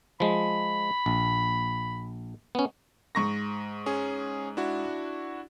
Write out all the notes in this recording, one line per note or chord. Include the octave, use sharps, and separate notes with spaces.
F3 G#3 B5
A#1
B3 C#4
G#2 C#6 A#6
C#4 G#4
D4 E4 F#4